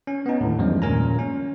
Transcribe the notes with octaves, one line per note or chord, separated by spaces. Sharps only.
C#4
B3 C#4 D#4
D#2 A2 D3
E2 G2 F3 G3 G#3 C#4
A#2 D#3 C#4 A#4 G#5 A#5
C#4